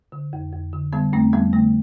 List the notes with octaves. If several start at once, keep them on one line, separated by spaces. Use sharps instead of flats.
D3
F2
F2
D3
D3 G3 B3
F2 A3 C4
F2 G3 B3
D3 A3